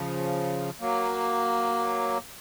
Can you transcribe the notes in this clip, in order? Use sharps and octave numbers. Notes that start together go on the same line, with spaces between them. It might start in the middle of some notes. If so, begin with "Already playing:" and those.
Already playing: C#3 F3
F#3 A#3